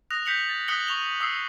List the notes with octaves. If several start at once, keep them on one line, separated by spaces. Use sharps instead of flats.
D#6 F#6 A#6 F7
G6 B6 C#7 F7 F#7
A6
D#6 F#6 B6 C#7 F#7 G7
C#6 F7 G7
D#6 E6 C7